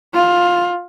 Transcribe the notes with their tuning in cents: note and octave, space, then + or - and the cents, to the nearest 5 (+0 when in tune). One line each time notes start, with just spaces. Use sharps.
F4 +15